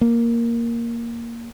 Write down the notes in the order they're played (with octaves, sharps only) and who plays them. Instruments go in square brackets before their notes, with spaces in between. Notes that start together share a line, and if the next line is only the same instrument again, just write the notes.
[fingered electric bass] A#3